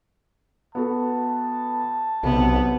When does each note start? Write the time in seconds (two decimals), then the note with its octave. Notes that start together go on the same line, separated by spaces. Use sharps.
0.75 B3 F#4 A4 A5
2.23 B1 C3 B3